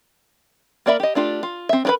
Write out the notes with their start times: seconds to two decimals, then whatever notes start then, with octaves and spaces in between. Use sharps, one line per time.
0.86 A#3 A#4 D5 E5 B5
1.00 G4 D#5
1.15 A3 D4 F4 G4
1.43 F4
1.69 C4 E5
1.85 D4 D#4 A#4 B4 B5